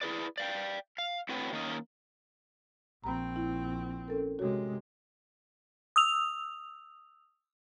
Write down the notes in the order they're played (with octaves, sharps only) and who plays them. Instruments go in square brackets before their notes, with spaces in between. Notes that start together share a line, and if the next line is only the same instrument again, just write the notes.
[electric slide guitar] E4 G#4 B4 D5
D5 F5 G5
F5
A2 C4 F#4 B4 C#5 G5
D#3 A#3 C#4 D#5
[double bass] A#1 C4 [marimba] A#5 B5
[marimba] E4
C#4 A4 A#4
[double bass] C3 G#3 [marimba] F#4 C#5
[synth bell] D#6 E6 F7